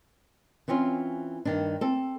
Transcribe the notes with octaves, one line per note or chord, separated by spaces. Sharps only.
E3 C4 C#4 F4
G2 D#3 D4
C4 A4